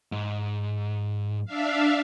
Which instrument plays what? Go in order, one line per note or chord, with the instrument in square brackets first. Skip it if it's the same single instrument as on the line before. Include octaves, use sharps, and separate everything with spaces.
[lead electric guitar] G#2
[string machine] D4 E5 F5